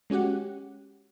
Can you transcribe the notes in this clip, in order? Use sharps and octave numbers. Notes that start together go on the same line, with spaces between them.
G#3 C#4 F#4 G4 F#5